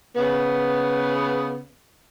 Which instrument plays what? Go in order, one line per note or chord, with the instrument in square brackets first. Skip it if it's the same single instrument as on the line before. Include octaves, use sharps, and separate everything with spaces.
[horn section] C#3 B3